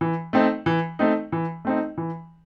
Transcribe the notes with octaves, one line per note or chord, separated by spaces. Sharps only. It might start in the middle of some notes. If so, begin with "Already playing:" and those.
E3
A3 C4 D#4
E3
A3 C4 D#4
E3
A3 C4 D#4
E3